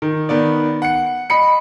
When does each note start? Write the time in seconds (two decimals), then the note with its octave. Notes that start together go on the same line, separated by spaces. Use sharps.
0.02 D#3
0.29 D#3 B3 D5
0.82 F#5 C#7
1.30 D#5 B5 C#7